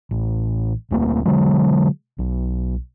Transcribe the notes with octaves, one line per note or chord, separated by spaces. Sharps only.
A1
D1 A3 A#3
D3 F#3 G#3
B1